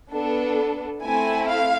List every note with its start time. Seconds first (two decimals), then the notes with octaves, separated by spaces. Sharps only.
0.12 B3 D4 A4
1.02 A3 C4 E4 G#5
1.47 F5